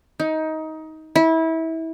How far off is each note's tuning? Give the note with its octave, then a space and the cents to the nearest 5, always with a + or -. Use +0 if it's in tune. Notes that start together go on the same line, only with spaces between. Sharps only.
D#4 +20
E4 -25